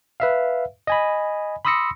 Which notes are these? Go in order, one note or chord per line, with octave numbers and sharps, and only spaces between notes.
B4 E5 F5
D#5 G#5 B5
B5 C6 D#6 E6 A#6 C#7